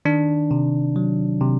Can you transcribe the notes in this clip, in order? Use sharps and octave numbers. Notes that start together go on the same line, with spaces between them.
D#3 D4
C3
F#3
C3